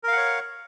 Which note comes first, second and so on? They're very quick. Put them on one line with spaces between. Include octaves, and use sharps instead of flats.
A#4 F5 F#5 C#5